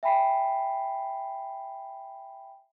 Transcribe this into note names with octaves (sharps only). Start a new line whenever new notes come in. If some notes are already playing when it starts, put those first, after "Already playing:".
E5 G5 G#5 B5 B6 C7